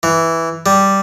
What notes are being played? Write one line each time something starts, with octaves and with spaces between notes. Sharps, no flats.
E3
G3